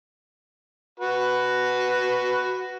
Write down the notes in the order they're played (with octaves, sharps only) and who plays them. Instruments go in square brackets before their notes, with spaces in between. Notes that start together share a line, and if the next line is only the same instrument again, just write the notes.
[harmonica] F#4 B4